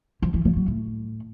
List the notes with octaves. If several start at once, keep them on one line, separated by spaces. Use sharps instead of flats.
F3
E3
F3
F#3
A2